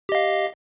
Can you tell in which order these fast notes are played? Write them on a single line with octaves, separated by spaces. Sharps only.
G4 D#5 F5